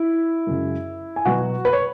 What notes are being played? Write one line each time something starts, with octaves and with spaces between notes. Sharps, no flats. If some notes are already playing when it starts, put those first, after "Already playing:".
Already playing: E4
F#2 C#3 G#3
G#5
B2 F#3 B3 F#4 F#5
B4
C#5